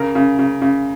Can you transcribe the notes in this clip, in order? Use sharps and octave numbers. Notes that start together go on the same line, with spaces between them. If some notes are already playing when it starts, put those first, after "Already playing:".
Already playing: C#3 A#4
C#3
C#3
C#3